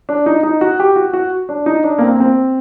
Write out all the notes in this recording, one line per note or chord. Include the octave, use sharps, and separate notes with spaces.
D4
D#4
D#4
F#4
G4
F#4
F#4
D4
D#4
D4
A#3
C4
A#3
C4